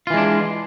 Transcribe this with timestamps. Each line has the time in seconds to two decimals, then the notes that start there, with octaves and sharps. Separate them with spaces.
0.07 F4
0.10 E3
0.14 G#3
0.17 D4